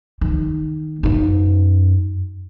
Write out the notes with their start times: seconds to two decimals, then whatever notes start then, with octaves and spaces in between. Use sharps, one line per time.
0.21 D#3
1.03 F#2 D#4